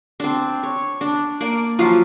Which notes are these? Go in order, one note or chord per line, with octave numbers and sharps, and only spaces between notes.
C4 D4
C#5
D4
A#3 D5
F3 F#3 F4